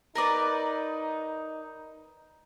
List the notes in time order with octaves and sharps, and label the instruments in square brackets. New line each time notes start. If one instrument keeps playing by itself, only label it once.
[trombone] D#4 [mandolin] A#4 B4 D5